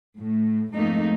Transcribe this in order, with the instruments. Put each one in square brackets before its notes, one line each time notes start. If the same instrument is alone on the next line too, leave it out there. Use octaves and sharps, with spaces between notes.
[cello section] A2
F2 G#2 A3 A#3 D#4